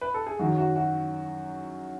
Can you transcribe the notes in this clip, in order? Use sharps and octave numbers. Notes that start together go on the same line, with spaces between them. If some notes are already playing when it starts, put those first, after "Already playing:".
B4
A4
G#4
F#2 D#3 F#3 F#4
F#4
F#4